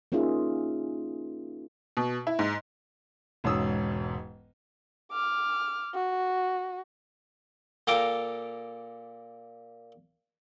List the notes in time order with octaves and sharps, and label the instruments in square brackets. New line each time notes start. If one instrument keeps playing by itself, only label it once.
[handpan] A#3 C#4 D#4 F4 G#4 E5
[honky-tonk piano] B2
E4
G#2
[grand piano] E1 G#2 C#4 D#6 E6
[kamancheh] D6 F6
F#4
[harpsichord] A#2 A4 F5 G5 A#5 D6